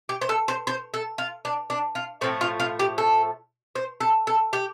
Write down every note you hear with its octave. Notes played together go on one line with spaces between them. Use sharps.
G4
C5
A4
C5
C5
A4
F4
D4
D4
F4
A2 F3 A3 C4
F4
F4
G4
A4
C5
A4
A4
G4